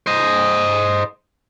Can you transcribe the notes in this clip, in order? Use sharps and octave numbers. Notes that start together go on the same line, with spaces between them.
C5 D#5